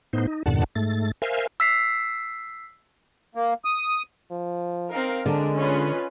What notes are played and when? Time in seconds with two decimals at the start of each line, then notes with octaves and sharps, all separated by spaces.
0.13 A2 B3 D#4 C5
0.27 D#4
0.46 E2 G2 A#2 D3 F#5 A5
0.75 G#2 A3 A6
1.22 A#4 C5 E5 F5 G#5
1.60 E6 B6 C7
3.35 A#3
3.65 D#6
4.31 F3
4.90 C4 D#4 A#4 F5 A#5
5.26 D3 G#3 D4 A#4
5.57 C#4 F4 B4 C#5 D#5